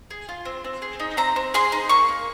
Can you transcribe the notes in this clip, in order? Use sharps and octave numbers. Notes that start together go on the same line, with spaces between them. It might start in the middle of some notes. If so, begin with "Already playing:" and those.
G#4
F4
C4
C4
G#4
D#4
C4 A#5
C4
G#4 C6
D#4
A#3 C#6
A#3